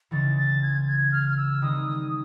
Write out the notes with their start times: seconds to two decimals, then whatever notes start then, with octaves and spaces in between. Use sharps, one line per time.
0.11 C#2 C#3 E3 G#3 C#4 A6
0.37 A6
0.63 G#6
0.87 G#6
1.12 F6
1.29 F6
1.37 E6
1.62 D#3 G3 C4 D#4 D#6
1.87 D#6